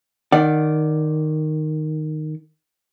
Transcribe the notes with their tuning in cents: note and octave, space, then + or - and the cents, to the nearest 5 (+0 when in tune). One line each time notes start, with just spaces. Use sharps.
D#3 -10 D5 +0 F#5 +0